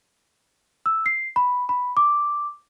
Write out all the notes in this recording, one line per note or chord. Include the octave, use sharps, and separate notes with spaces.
E6
C7
B5
B5
D6